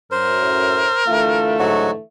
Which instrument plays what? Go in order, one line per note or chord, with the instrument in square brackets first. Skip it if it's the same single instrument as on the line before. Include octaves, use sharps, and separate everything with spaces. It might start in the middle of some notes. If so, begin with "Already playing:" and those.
[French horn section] F#2 [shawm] A#4 [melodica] C5
[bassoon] A2
[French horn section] D3 E3 A3 [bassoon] F4
[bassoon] G#2 [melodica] F#3 F#4